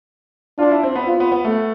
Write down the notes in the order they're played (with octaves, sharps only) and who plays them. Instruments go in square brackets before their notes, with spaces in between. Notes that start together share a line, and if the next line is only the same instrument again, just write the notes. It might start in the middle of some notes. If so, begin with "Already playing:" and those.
[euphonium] D4 [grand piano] F4
[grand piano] E4
C4
B3
[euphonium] F4
[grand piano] B3
B3
A3